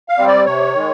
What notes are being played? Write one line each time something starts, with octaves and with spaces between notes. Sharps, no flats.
F5
G3 C4
D5
C3 C#5
D#3 G#3